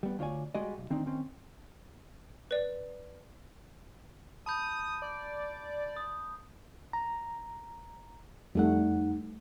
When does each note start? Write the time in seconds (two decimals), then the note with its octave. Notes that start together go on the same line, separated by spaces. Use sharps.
0.03 G3 B3
0.19 D2 F4 C#5 D5 G#5
0.55 G3 G#3 F#4 D5 D#5
0.78 B1
0.90 D#3 C4 D4 D#4
1.06 D#3 C4 C#4
2.51 B4 D5
4.46 A5 B5 D#6 G6
5.02 D5
5.96 D#6
6.93 A#5
8.55 F2 G3 A3 D#4 F#5